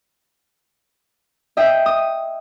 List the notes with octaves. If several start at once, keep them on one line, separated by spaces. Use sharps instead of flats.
D#5 E5 G5
D#6